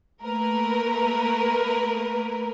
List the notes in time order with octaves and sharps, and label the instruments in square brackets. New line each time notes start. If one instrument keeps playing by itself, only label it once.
[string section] A3 A#3 A#4 B4